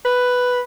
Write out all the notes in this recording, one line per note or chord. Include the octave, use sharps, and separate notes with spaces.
B4